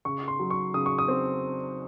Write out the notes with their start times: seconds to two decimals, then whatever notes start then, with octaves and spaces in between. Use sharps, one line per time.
0.05 C#3 C#6
0.28 C6
0.39 F#3
0.50 C#6
0.74 C#3 D#6
0.86 C#6
0.98 D#6
1.08 C4